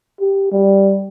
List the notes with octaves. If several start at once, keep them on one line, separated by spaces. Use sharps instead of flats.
G4
G3